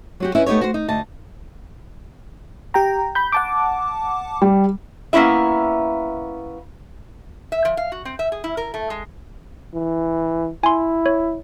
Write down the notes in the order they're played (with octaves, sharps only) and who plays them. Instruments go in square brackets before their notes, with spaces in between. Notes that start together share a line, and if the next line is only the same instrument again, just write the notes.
[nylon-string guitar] F#3 F#4 G4
C#4 E4 B4 D#5 E5
A3 B3 D#4 G4 C#5
F#4 C5
D#4
D2 D#5 A5
[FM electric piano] G4 G5 A#5
B5 G6
F#5 A5 D6
[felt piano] G3
[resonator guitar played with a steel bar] A#3 B3 C#4 E4 E5
E5
F3
F5
F#4
C4
E5
G#4
E4
A#4
A3
G#3
[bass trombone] E3
[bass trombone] E4 [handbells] G#5 C6
[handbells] C#5